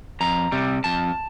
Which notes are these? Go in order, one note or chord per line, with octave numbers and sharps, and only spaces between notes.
F2 A#5
C3 G3
F2 A5